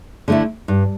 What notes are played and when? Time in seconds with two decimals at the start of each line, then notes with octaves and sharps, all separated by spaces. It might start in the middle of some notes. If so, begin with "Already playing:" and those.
0.28 D3 A3 E4
0.68 G2